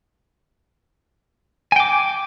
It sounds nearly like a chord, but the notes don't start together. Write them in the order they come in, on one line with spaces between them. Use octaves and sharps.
G#5 G5 D6